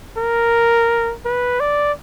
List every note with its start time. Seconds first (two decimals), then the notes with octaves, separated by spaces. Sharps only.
0.17 A#4
1.25 B4
1.60 D5